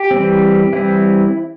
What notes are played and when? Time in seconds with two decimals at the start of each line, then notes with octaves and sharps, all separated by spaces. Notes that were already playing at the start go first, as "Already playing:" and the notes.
Already playing: G4
0.11 E3 G3 C4
0.73 E3 G3 C4 E4